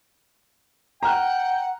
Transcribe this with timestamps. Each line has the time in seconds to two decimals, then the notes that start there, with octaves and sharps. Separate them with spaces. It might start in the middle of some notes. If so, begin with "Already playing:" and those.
1.03 F#5 G5 A#5 F6 F#6